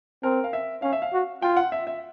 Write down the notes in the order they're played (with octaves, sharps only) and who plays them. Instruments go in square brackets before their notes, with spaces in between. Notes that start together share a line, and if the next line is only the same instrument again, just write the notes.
[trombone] C4 [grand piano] A#4
[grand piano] F5
E5
[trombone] C#4 [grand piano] F5
[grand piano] E5
F5
[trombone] F#4
[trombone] F4 [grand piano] G5
[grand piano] F#5
E5
E5